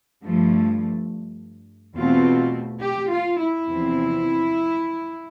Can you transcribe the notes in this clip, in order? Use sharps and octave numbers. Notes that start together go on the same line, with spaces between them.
G2 F3 A3
E2 B2 A3 C4 F4
G4
F4
E4
E2 C3 F3 C4